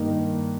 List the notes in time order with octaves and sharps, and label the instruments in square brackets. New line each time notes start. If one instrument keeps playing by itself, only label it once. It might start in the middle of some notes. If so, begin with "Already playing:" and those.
Already playing: [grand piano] G2 D#3 A#3 D#4